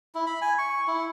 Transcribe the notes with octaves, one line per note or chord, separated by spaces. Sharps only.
E4
B5
G#5
C#6
E4